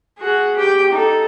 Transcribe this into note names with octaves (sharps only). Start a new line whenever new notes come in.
F#4 G#4
G4 G5
D#4 A4